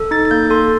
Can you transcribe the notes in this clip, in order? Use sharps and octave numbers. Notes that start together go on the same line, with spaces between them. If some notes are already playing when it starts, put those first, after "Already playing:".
Already playing: A4
D#4 A6
A6
A#3 G6
A4 C6